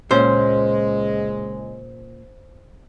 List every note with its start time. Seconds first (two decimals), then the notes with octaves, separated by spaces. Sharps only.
0.11 C#2 A#2 G#3 C#4 C5 C6